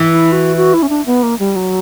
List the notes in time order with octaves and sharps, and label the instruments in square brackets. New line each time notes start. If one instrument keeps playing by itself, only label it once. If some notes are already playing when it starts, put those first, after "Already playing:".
Already playing: [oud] E3
[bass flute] E4
F#4
F#4
E4
C#4
D4
B3
A#3
G3
F#3